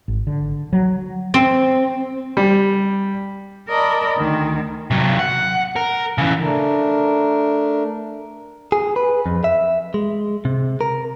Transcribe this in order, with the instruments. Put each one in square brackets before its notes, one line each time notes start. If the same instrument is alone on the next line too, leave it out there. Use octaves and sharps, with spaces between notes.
[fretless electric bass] G#1
D3
F#3
[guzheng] C4
[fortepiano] G3
[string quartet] A#4 D5 D#5 A5 B5
D2 D#3
[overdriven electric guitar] C3 F#3
F#5
A#4
C#3 E3
[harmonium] A3 D4 A#4
[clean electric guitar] G#4
B4
F2
E5
G#3
C3
A#4